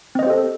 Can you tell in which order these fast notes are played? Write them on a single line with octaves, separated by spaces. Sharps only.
C4 D#5 C5 G4 A4